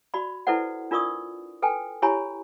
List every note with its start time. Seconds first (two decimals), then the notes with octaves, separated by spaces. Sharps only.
0.14 F#4 D5 B5
0.47 E4 A4 B4 C5 D5 F#5
0.91 D4 F4 A#4 D5 C#6 D#6
1.62 A4 B4 G5 G#5
2.02 E4 G4 C#5 G#5 A#5 B5